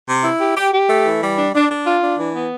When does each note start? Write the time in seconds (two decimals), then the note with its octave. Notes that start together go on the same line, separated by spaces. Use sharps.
0.08 C3
0.24 E4
0.41 G4
0.57 G4
0.74 G4
0.90 A3
1.06 E3
1.21 G3
1.38 D4
1.55 D4
1.71 D4
1.87 F4
2.02 D4
2.19 E3
2.35 B3